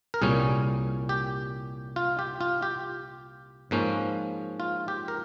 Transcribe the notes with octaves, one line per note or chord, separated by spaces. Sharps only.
A#4
C2 A#2 G3 C#4 G#4
G4
F4
G4
F4
G4
G#2 F3 A#3 C#4
F4
G4
A#4